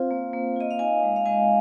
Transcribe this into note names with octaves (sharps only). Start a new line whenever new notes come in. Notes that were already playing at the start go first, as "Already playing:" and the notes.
Already playing: C4 F4 C5 F5
A#3
A#3
F4 D#5
F5
D#4 D#5 G#5
G#3
F5
G#3 D#5 G#5